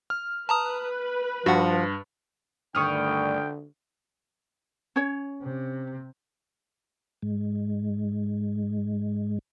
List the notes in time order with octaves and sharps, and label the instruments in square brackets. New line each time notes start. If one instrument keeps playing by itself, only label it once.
[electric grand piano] F6
[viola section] B4 [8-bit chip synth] A5 A#5 D#6
[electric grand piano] G2 [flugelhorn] F3 [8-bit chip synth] F#4 F#5
[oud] D2 G2 D#3 [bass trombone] D3 [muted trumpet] G5 [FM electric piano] C#6 D#6 F6
[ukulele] C#4 C#5
[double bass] C3
[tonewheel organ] G#2 G#3